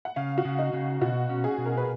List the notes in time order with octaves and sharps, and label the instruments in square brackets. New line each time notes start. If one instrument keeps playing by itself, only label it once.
[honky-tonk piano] F#5
[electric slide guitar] C#3 [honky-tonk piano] F5
[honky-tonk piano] F#4
[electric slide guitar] C#3
[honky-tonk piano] D#4
[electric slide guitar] C#3
[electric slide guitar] B2 [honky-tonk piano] F#4
[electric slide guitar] C#4
[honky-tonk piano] G#4
[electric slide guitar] B2
[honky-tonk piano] A#4
B4